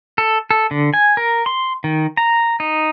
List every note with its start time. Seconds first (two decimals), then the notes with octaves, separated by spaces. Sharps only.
0.18 A4
0.51 A4
0.71 D3
0.94 G#5
1.17 A#4
1.46 C6
1.84 D#3
2.17 A#5
2.60 D#4